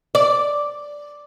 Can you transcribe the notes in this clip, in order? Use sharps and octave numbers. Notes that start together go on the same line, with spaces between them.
D5